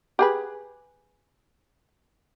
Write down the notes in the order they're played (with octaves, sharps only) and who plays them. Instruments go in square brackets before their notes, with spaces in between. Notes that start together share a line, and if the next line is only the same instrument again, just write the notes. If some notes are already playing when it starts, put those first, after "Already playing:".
[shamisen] G4 G#4 B4